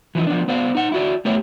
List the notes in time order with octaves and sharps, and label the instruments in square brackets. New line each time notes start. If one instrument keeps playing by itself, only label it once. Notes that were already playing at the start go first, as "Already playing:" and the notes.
[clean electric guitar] E3 F3 D#4
F3 B3 D4
B3 C5 D5 F5
D#4 F#5
E4 F#4 D5
A3 B3 E4 G4 C#5